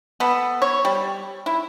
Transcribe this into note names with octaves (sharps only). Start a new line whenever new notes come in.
B3 A4
C#5
G3
E4